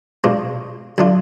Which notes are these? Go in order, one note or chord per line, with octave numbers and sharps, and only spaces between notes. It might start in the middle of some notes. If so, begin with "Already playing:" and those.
B2 G#3 D4 F4
D3 F#3 D4 F4